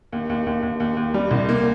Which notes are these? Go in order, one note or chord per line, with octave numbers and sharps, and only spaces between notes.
D#2
D#2
D#2
D#2
D#2
D#2
G3
C2
A#3